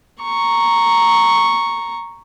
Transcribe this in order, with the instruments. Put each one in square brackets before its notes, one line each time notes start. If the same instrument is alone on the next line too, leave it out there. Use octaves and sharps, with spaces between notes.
[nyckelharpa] A#5 C#6